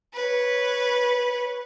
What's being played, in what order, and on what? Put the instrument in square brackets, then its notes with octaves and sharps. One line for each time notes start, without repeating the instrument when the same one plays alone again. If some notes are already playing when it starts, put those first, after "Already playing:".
[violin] B4 C#5